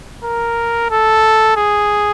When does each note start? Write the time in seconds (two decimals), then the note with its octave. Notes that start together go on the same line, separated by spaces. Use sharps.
0.24 A#4
0.91 A4
1.57 G#4